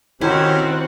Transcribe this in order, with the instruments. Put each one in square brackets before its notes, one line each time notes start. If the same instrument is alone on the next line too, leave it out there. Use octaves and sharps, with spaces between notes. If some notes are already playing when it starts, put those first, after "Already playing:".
[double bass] D#3 [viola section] C4 F#4 F#5 [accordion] C#4 G4 C5 [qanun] E4